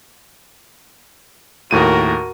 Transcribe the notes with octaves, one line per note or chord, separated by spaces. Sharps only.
D#2 A2 F#4 A#4 D#7